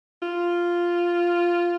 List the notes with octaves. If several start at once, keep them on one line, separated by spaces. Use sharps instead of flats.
F4